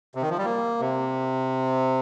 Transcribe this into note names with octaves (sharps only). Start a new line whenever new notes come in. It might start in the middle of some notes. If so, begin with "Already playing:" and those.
C3
D#3
F3
G3
A#3
C3